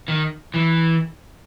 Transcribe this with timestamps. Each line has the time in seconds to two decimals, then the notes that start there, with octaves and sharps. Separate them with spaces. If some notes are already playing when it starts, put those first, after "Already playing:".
0.08 D#3
0.54 E3